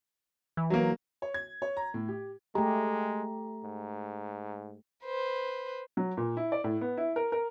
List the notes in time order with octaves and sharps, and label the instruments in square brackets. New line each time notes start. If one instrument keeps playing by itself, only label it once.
[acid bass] E3
[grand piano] F#3 A#3
C#5
G#6
C#5
A#5
A2
G4
[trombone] G#3 [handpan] A3 G4 [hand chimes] A#5
[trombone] G#2
[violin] B4 C5
[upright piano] F#3
A#2
E4
D5
A2
B3
E4
A#4
A#4